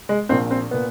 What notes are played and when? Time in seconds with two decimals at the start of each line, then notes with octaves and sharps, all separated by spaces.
0.09 G#3
0.29 A#1 A#2 C4
0.51 C4
0.71 A#2 B3